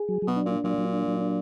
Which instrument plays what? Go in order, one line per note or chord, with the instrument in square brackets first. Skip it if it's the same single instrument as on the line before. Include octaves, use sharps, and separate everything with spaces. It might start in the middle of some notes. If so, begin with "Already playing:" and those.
Already playing: [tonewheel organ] G#4
F#3
[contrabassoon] B2 [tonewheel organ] F#3
[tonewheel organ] D4
[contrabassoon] A#2
[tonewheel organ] D4
[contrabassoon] A#2 [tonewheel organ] F#3
[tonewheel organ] F#3
D4
F#3
D4